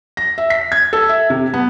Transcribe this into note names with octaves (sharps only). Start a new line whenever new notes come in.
A#6
E5
B6
G#6
A4
E5
C3
B3